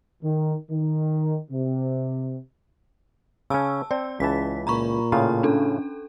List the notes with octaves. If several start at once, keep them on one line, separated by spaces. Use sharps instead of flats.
D#3
D#3
C3
C#3 C#4 A5 E6
C4 D5
C#2 C#3 E3 A5 B6
A#2 A#5 B5 C#6
A2 C#3 F4 A#5
C#4 D4 A4